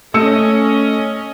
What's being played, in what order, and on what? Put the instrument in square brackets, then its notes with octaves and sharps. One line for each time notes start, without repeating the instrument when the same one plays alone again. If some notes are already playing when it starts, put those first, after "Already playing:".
[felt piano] A3 E6 C#7 [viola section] C#4 D#5